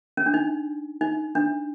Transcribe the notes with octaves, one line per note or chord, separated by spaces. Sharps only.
C#4
D4
D#4
D#4
D4